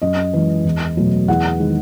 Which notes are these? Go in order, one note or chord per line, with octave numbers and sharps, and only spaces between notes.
F#2 D#5
E3 G#3
E2
B2 F#3 A3
E2 F#5
D#3 G#3